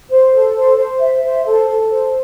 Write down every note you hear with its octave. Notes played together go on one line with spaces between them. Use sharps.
C5
A4
C5
C5
E5
C5
A4
A4
C5